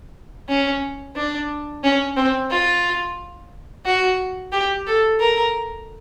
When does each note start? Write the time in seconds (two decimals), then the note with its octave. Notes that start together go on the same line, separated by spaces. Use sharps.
0.48 C#4
1.16 D4
1.84 C#4
2.16 C4
2.50 F4
3.85 F#4
4.52 G4
4.87 A4
5.20 A#4